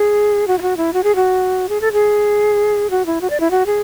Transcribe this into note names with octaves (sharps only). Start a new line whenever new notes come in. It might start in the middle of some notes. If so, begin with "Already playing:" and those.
Already playing: G#4
F#4
E4
F#4
E4
F#4
G#4
F#4
G#4
A4
G#4
F#4
E4
F#4
D5
E4
F#4
G#4